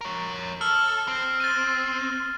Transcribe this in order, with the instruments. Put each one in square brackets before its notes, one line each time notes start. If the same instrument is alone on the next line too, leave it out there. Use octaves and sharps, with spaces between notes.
[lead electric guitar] A#4 C#5
[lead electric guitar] A4 [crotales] E6 F6 F#7
[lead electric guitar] C4
[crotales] A6 D#7